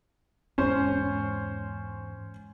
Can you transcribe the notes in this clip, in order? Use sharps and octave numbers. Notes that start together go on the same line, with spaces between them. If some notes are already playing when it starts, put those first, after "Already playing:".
E2 G#2 C#4 C5